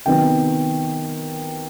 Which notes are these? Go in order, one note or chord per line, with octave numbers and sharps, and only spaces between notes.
C3 D#3 F#3 B3 G5